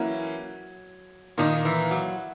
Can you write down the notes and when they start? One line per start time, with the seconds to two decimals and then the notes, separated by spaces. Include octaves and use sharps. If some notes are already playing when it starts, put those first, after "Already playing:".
Already playing: E3 F#3 A#3 C#4 E4
1.38 A#2 D#3 A#3 D#4 A#4
1.65 E3
1.91 F#3